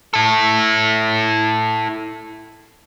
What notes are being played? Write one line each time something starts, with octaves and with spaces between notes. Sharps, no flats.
E4 A4